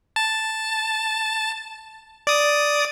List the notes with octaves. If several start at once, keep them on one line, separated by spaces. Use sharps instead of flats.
A5
D5 D#6